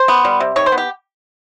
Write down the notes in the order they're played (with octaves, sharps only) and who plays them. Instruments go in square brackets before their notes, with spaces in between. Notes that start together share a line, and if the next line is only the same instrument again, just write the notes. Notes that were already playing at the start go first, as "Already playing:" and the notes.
Already playing: [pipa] C5
B3
G3
C3
D#3 C#5
C5
B3
G4